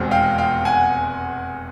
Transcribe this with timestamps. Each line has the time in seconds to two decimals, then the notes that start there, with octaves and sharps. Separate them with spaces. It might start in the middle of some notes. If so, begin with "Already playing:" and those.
Already playing: F1 E2 B2 G#3 C4
0.11 F5 G5
0.38 F5 G5
0.65 F#5 G#5